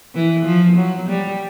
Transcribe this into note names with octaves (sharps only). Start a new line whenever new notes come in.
E3
F3
F#3
G3